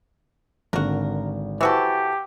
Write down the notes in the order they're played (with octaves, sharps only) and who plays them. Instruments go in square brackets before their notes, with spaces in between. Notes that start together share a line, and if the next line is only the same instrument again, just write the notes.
[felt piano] G#1 D3 [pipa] F#4 A#4
[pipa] E3 F#4 A4 [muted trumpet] G4 [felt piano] C5 C#6 E6